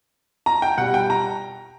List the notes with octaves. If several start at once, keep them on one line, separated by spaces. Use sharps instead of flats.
A#5
G5
B2 G3 F#5
G5
A#5